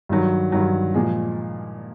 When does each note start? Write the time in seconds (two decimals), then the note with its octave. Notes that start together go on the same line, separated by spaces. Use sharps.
0.09 G2 D#3 F#3
0.52 G2 D#3 F#3
0.94 A#2 F3 G#3